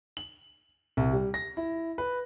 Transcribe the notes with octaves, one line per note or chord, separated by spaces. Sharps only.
F#7
C2
G3
A#6
E4
B4